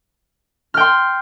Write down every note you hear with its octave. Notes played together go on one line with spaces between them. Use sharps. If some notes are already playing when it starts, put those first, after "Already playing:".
G5 C6 F6